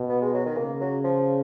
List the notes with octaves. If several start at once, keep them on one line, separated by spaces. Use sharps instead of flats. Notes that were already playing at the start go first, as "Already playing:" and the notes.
Already playing: B2
B3
G#3
F#3
D#3
C#3 A#3
F#3
F3